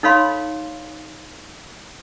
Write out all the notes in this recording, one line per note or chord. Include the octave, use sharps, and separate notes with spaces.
D#4 A4 C#5 F5 B5 C6